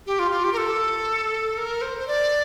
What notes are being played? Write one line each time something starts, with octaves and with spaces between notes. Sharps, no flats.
G4
F4
F4
G4
A#4
A4
A#4
C5
C5
D5